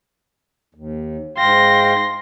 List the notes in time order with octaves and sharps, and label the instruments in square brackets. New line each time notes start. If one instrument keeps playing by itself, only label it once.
[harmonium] D#2
[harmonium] G#2 F5 G5 [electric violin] C6 A#6